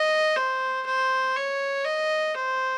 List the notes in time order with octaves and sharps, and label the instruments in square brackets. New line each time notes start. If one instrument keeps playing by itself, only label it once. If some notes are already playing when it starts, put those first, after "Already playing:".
Already playing: [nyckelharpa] D#5
C5
C5
C#5
D#5
C5